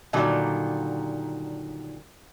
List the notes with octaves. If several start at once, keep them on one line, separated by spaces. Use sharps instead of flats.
A#2 D3 D#3 F#3 G3